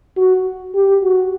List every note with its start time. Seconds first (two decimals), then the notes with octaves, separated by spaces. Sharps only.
0.17 F#4
0.75 G4
1.03 F#4